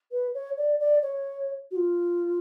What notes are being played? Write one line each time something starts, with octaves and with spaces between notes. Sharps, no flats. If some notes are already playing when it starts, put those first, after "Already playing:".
B4
C#5
D5
D5
C#5
F#4
F4